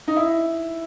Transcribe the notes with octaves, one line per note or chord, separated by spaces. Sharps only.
D#4
E4